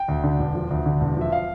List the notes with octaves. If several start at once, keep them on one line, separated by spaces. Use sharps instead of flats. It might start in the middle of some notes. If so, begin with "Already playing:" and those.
Already playing: G5
D2
D3
E1
F3
D2
D3
E1
F3 E5
F5